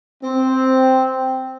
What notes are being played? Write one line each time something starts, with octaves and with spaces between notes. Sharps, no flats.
C4